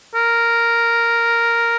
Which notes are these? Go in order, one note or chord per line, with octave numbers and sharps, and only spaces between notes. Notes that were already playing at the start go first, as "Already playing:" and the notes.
A#4